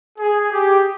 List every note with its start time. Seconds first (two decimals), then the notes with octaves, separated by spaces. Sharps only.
0.19 G#4
0.51 G4